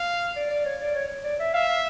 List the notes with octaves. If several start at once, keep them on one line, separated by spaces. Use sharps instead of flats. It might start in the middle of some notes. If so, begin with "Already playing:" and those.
Already playing: F5
D5
D5
C#5
D5
C#5
D5
E5
E5 F5
F5